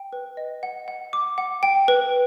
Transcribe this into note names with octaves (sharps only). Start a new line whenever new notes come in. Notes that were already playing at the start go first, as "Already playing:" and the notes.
Already playing: G5
B4
D#5
F#5
F#5
D6
F#5
G5
B4